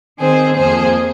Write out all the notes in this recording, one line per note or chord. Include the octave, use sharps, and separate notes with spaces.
D#3 C4 G#4 C5
F2 F3 A#3 G#4 C5